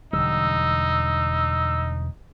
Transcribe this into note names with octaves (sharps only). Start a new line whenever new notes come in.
E1 D3 G3 D#4 E6